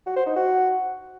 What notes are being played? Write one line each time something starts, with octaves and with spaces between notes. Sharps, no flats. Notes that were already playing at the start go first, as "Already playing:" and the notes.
F#4
C5
D#4
F#4